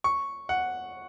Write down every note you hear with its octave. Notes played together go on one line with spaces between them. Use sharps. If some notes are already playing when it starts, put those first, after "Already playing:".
C#6
F#5